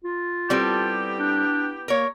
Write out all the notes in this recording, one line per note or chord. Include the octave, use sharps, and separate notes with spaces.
F4
G3 B3 C4 E4 G4 A4
D4
A#3 A#4 C#5